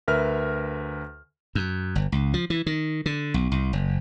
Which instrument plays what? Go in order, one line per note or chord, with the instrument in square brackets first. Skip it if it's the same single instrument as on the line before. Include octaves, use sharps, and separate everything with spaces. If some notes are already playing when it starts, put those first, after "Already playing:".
[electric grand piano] D2 A#4 B4 E5 F6
[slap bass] F#2
G1
C#2
F3
E3
D#3
D3
B1
C2
F#1